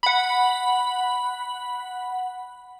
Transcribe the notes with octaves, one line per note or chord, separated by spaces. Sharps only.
F#5 B5